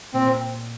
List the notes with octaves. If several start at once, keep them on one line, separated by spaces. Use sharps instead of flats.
A#2 C4